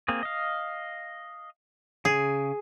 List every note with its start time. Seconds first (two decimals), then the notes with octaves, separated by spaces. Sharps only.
0.08 A#3 C4 G#4
0.23 D#5 F5
2.05 C#3 G#4